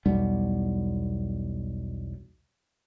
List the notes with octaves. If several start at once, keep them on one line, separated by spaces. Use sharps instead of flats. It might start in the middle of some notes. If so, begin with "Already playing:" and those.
B1 E2 G3 B3